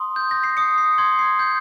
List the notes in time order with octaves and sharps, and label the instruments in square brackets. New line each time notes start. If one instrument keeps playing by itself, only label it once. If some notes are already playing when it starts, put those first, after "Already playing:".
Already playing: [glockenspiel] C6 D#6
G6
A#6
C7
D#6 C#7
C7
C6 G#6
C7
G6